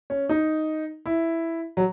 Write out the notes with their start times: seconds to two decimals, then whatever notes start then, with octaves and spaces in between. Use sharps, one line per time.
0.10 C#4
0.29 D#4
1.06 E4
1.77 F#3